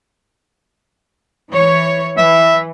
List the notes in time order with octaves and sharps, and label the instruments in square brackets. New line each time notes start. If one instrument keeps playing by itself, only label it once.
[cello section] E3 C#5
[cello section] E3 [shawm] E5